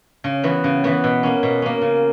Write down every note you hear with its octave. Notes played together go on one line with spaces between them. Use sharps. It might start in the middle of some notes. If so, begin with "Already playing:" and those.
C#3
E3 B3 F#4
C#3
E3 B3 F#4
B2
A#3 C#4
B2
A#3 C#4
C#3